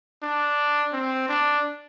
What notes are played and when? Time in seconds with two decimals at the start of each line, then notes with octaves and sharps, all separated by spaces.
0.22 D4
0.92 C4
1.28 D4